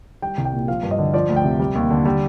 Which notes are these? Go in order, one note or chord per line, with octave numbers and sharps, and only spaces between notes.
G3 G5
C2
G5
A#2
F3 F5
G2
D#5
D3
F3 D5
D2
G5
C3
G3
D#2
D3
G3